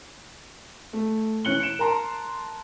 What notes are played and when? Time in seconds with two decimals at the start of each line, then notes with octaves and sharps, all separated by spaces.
0.93 A3
1.45 E3 C#4 F#6 C#7 F#7 G7
1.60 C#7 D7 E7
1.79 A#4 A5 A#5 C6